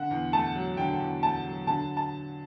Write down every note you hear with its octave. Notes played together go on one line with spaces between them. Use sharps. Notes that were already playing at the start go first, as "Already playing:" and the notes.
Already playing: D3 F#5
E2
A3 A5
F#3
D3 G5
E2
A3 A5
F#3
D3 A5
A5